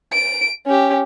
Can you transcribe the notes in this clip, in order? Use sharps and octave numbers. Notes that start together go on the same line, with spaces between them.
D7
C#4 G4